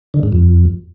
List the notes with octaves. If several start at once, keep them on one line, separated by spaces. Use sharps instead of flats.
D3
G#2
F2